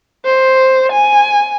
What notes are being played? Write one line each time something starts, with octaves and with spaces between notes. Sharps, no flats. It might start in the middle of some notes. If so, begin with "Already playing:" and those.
C5
G#5